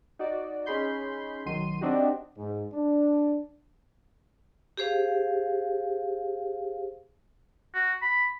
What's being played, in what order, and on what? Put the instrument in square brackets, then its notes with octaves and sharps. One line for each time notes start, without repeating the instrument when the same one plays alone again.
[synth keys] D#4 F#4 D5
C#4 D#4 G#4 B5 C6 G6
B1 D#3 F#3 C6 D#7
C4 D4 D#4 F#4 G4
[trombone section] G#2
D4
[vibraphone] G4 G#4 C5 F5
[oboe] F#4
B5